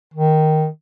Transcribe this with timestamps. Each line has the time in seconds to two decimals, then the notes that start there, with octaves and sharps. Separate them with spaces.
0.14 D#3